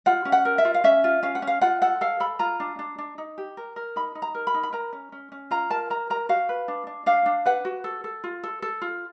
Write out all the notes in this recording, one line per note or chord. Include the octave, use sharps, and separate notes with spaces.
F4 F#5
C#4
F#5
A#4
E5
F4
F5
C#4 E5
F4
C#4 F5
F#5
C#4
F5
F4 F#5
A4 F#5
A4 F5
A4 B5
F4 A#5
D4
D4
D4
D#4
G4
A#4
A#4
D#4 B5
D#4
A#5
A#4
B5
D#4
B5
A#4 A#5
C#4
C#4
C#4
F4 A#5
A#4 A5
A#4 A#5
A#4 A#5
F#4 F5
B4
D4
D4
D4 F5
D4
B4 F#5
F#4
A4
A4
F4
A4
A4
F4